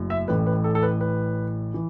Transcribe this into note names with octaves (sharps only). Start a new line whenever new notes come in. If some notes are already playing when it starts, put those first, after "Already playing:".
Already playing: F#1 F#2 F#3 A3 E4
E5
A1 A2 E3 B4
B4
A4
A4
B4
B4
E3